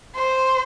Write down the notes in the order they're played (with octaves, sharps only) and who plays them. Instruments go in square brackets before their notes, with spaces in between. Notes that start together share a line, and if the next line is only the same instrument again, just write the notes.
[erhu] C5